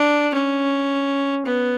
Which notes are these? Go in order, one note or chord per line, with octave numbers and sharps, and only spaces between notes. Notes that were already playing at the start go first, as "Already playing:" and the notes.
Already playing: D4
C#4
B3